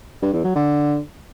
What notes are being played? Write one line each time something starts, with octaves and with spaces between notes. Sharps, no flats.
G2
E2
F#3
D3